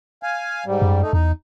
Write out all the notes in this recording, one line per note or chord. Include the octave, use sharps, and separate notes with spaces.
F5 G#5
G#2 G3
F#2
A3 D#4
E2 D#4